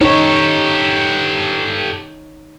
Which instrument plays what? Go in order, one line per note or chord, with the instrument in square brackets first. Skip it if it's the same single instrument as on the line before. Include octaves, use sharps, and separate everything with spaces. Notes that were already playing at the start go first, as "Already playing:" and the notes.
[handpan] D#4 C#5 [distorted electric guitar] G4 A4